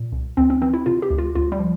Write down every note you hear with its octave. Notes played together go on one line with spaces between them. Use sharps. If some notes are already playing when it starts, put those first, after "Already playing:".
Already playing: A#2
C2
D2 C4
C4
E3 C4
E4
C3 F4
G4
D2
F4
D2 F4
G3
F3